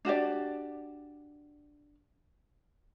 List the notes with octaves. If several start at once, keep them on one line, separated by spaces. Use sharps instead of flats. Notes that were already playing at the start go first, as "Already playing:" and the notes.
D4 F#4 G4 D5